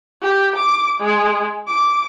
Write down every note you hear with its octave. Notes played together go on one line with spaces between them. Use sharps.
G4
D6
G#3
D6